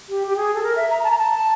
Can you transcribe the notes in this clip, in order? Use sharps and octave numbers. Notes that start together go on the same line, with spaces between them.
G4
G4
G#4
A4
A#4
E5
A#5
A5
A#5
A5